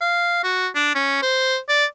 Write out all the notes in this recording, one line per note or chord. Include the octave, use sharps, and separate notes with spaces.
F5
F#4
D4
C#4
C5
D5